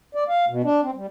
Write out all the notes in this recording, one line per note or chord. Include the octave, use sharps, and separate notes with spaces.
D5
F5
B2
D4
C4
G3